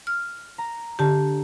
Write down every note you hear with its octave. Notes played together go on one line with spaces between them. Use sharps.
F6
A#5
D3 G4 A5